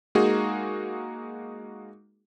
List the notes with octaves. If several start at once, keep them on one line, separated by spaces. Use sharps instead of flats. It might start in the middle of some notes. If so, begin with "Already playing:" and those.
G#3 A#3 D#4 F#4 G#4